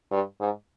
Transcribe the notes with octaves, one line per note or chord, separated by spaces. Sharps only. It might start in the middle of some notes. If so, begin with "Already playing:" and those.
G2
G#2